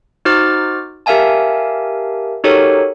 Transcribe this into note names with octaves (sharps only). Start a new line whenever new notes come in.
D#4 F#4 C5 D6 F6 A6
G4 A#4 E5 F5 G#5 A5
D#4 F#4 G4 A4 A#4 C#5